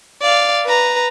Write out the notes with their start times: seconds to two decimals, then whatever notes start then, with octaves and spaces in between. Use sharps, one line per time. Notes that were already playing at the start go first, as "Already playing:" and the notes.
0.22 D5 F5
0.66 B4 A#5